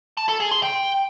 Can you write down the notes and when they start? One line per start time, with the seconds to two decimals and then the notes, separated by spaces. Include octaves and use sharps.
0.17 A5
0.29 A4
0.40 G#4
0.51 C6
0.63 G5